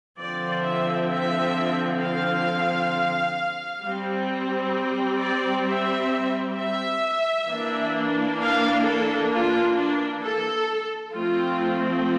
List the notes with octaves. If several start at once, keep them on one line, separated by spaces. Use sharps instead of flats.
D3 F3 C4 D5
E5
E5
F5
G3 C4
D5
E5
E5
E3 A#3 D4
F5
A4
F4
D4
A4
F3 A3 C4 F4